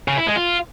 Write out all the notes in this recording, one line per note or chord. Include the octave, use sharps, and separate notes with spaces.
C#3
E4
G#3
F4